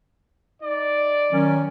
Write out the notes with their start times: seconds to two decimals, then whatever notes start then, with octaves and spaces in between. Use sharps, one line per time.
0.62 D#4 D5
1.33 D#3 F#3 C#4